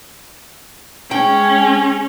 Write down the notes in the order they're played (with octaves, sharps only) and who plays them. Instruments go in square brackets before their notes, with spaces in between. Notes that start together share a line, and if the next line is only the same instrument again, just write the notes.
[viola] G#3 C#4 [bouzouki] G5